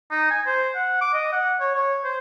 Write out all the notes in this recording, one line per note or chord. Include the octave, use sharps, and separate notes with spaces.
D#4
G#5
C5
F#5
D6
D#5
F#5
C#5
C#5
C5